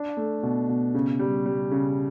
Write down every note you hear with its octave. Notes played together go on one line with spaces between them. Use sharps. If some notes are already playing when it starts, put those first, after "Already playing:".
Already playing: D4
A3
B2
B2
C#3
G3
G3
C#3